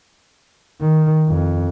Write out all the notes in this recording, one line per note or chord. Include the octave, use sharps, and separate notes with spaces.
D#3
F2